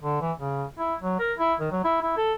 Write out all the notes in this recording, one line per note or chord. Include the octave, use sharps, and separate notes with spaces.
D3
E3
C#3
E4
F#3
A#4
E4
D#3
F#3
E4
E4
A4